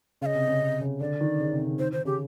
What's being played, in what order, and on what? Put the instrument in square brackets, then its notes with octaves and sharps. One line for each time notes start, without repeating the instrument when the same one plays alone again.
[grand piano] C#3 [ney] F5
[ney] D#5
[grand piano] C3
C#3
C3
C#3
[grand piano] D3 [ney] D5
[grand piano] D#3
C#3
C3
C#3
[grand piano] D#3 [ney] C5
[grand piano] D#3 [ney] C5
[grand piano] C#3 [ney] G4